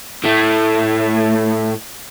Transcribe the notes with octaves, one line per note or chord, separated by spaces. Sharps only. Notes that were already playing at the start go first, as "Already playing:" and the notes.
A2 A3